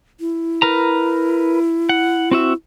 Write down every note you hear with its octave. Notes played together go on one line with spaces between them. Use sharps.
E4
A#4 B4 A#5
F#5
C4 F#4 E5